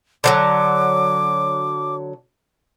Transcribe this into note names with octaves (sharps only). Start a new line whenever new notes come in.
D3 F3 F#3 D6